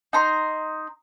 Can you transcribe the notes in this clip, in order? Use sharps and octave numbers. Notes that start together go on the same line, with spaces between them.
D#4 A#5 C6